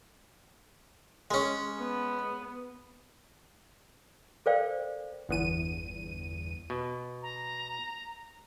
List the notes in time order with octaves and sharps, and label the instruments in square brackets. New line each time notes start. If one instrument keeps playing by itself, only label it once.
[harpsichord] G#3 C#4
[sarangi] B3
[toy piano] A4 A#4 C5 D5 F5 G5
[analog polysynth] G1 E2 D#7
[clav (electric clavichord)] B2
[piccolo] A#5